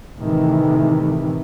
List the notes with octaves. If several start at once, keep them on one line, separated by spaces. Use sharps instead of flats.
A2 C3 D#3 E3 A3